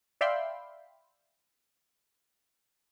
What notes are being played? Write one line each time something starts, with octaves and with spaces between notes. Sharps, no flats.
D5 E5 F5 G5 B5 C6